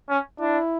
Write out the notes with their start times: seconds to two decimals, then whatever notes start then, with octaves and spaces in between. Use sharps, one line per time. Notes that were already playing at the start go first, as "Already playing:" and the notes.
0.10 C#4
0.40 D4 E4